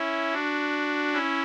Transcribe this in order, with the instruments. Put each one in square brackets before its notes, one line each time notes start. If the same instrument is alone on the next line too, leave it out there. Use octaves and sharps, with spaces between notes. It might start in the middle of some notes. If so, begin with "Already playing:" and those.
Already playing: [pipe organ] C#4 E4
D4 F#4
C#4 E4